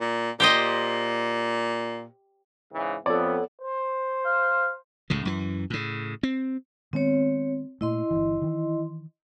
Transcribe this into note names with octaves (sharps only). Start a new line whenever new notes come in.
A#2
A#2 G4 C5 D#5
G#2 C#3 E3
F2 B3 A4 C#5 D5
C5
F5
C#2 A2 C#3
F#2 E3
A2 C#3
C4
D#3 G#3 B3 C4 C#5
A#2 A3 E4 D#5 C6
G1 C#2 E3
D#3 E3